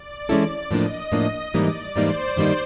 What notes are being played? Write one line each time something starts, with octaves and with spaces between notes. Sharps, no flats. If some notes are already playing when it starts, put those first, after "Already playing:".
Already playing: D5
E3 G#3 C#4 E4 A4
A2 F3 A#3 D4 D#5
A2 F3 A#3 D4 D#5
G#2 E3 G3 A#3 D#4 D5
G#2 E3 G3 A#3 D#4 C5
G2 D#3 G3 A#3 D#4